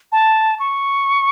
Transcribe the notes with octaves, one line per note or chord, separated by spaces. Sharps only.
A5
C#6